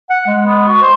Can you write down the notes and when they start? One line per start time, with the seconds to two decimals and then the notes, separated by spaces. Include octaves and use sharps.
0.10 F#5
0.27 G#3
0.46 B3
0.68 F#4
0.82 C5